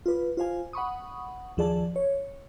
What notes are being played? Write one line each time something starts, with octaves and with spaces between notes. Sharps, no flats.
F4 B4
F4 C5 F5 G#5
F#5 B5 C#6 D#6
D#2 F3 G#4 D5 A5
C#5